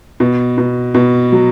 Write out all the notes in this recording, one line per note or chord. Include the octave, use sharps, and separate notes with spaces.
B2
B2
B2
F#3